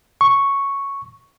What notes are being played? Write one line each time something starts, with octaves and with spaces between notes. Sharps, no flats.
C#6